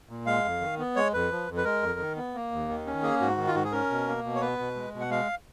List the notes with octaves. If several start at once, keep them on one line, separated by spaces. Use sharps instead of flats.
A#2
G#3 F5
F2
D#3
B3
G#3 C#5
F2 B4
F3
F2
B4
G#3 A#4
F2
D#3
B3
A#3
D#2
D#3
C#4
A#3 G#4
G#2 F#4
D#3
F4
G#2 F#4
G#4
C#4 A#4
B2
A#3
B2
C#5
B3 B4
B2
G#3
B2
F#5
G#3 F5